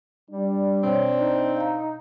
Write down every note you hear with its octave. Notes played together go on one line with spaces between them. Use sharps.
G3 D4
B2 C4 C#5
D#4
F5 A#5